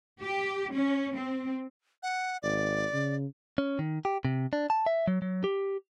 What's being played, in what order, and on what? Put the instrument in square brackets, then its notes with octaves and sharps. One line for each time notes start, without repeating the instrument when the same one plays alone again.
[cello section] G4
C#4
C4
[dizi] F#5
[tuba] G#1 [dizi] D5
[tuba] C#3
[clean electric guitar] C#4
D#3
G4
C3
D4
A5
E5
F#3
F#3
G4